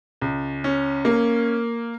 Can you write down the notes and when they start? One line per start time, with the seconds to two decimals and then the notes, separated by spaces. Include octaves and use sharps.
0.21 C#2
0.64 C#4
1.05 A#3